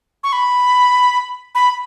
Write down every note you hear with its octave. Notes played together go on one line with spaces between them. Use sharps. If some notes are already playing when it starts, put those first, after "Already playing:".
C#6
B5
B5